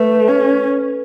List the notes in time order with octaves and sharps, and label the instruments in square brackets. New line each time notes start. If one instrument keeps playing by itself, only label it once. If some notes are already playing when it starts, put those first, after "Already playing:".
Already playing: [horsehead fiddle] A3 [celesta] A4 B4
[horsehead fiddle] C#4